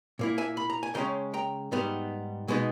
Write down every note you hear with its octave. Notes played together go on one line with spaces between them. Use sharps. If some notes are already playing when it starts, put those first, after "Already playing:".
A#2 A#3 E4
E5 G#5
B5
A#5
G#5
C#3 G#3 C#4 G5 A#5
G5 A#5
G#2 G3 B3 D#4
B2 G#3 B3 D#4